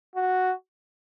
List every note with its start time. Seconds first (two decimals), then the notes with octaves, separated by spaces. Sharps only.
0.15 F#4